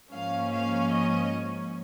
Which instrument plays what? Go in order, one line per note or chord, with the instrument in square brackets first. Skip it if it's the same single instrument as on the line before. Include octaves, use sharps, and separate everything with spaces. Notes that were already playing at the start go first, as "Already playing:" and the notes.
[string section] G#2 F3 A#3 C#4 F5
F5
D#5